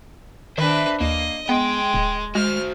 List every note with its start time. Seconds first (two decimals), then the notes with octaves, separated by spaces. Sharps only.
0.58 D#3 D4 B4 C5 E5
1.01 D#2 A#3 D#5
1.49 G#3 B3 G5
1.94 D1
2.35 G#3 F#4 C5 F6